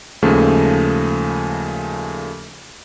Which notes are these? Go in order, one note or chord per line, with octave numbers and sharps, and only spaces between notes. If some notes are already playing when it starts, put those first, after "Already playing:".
D#2 C#3 F3 G#3 A3